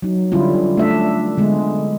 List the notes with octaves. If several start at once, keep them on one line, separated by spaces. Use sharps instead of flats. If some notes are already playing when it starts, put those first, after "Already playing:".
F#3 D#4
D3 G3 C#4 E4 F4
A3 D4 E5
D3 G#3 B3